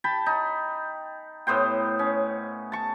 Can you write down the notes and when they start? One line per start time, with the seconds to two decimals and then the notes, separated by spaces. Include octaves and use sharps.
0.04 G5 A5 B5
0.26 D#4
1.47 A2 B3 C5 G5
1.99 C#4
2.72 A5 C#6